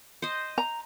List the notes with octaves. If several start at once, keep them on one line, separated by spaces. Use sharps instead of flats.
C5 D#5
A#5